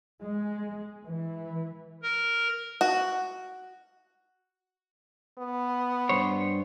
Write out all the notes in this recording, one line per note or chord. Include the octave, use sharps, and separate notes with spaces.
G#3
E3
A#4
F#4
B3
G2 C5 C#5